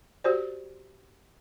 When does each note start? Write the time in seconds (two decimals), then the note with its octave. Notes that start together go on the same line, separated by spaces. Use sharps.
0.24 F#4 G4 C5 D5